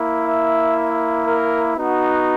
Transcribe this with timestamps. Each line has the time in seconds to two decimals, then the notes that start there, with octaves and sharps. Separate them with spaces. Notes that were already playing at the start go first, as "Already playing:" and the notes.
Already playing: A#3 E4
0.23 E5
1.25 A#4
1.77 B3 D#4 F#4